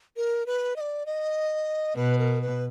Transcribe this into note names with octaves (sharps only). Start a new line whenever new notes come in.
A#4
B4
D#5
D5
D#5
B2 B4
A#4
B4